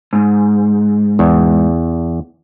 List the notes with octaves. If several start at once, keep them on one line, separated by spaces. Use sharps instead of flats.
G#2
E2